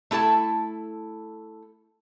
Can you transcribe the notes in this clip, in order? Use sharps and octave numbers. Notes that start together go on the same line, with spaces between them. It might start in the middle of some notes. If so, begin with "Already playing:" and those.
A3 E4 A4 A5